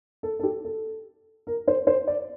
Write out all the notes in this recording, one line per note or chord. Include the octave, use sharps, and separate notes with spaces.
A4
A4
G4
A4
A#4
C5
C5
D5